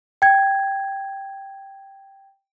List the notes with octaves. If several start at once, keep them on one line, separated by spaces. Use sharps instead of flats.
G5 G#6